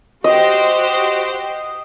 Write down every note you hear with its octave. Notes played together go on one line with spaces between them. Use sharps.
F#4 G4 C5 D#5